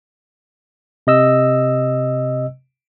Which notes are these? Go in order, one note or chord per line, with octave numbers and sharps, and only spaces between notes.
C3 D#5 E6